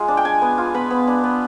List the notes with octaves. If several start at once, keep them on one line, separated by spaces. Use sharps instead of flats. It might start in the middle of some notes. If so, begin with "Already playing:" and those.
Already playing: G#3 F4
D4
G5
D4 G#5
B3
F4
B3 B5
B3
D4
B3